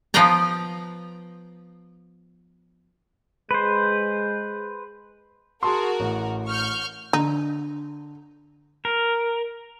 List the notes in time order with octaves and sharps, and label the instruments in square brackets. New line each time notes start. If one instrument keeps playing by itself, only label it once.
[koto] F3 B3 B4 F5 G5 A#5
[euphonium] G#3 [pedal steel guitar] B4 C5
[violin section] F#4 A#4 [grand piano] G#4 A5 C6
[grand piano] A1
[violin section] C#6 F6 G6
[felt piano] D3 [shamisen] D#4
[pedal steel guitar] A#4